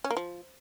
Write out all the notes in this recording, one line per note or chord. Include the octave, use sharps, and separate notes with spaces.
C#4
A#3
F3